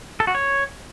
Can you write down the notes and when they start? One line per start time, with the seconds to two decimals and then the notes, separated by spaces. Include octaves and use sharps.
0.20 A4
0.27 F#4
0.35 C#5